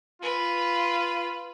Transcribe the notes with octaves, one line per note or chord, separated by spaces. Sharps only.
F4 B4